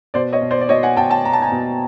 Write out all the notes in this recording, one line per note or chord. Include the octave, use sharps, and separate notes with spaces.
B2 C5 D5
C#5 D#5
B2
C5 D5
D5
B2 C#5 D#5
F#5 G#5
B2 G5 A5
G5 A5
B2 A#5
A5
G#5 A#5
B2